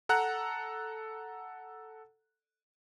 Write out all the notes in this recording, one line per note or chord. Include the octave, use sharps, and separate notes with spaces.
A4 F#5 A#5 F#6